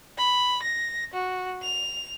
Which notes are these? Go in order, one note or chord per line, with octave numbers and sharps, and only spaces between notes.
B5
A#6
F#4
F7